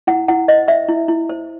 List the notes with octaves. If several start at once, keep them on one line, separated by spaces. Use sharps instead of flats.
E4 F#5
E4 F#5
C5 D#5
C5 E5
E4
E4
C5